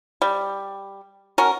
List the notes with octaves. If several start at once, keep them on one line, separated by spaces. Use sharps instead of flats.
G3
C#4 F#4 A#4